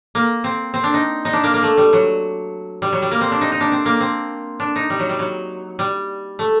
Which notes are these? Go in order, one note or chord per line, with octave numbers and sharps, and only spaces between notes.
A#3
C4
C4
D4
D#4
D#4
D4
A#3
A#3
A3
G3
F#3
G3
F#3
G3
A#3
C4
D4
D#4
D#4
D4
C4
A#3
C4
D4
D#4
G3
F#3
G3
F#3
G3
A3